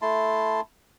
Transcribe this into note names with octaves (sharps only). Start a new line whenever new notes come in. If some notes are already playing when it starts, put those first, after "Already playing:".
A3 E4 A5 C6